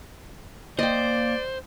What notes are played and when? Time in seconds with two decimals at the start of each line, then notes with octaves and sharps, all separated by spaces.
0.79 A#3 C5 D5 D#5 G5